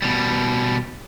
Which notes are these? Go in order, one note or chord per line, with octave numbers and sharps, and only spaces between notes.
B2 G3